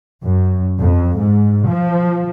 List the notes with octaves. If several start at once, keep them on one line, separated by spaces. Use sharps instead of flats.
F#2
F2
G#2
F3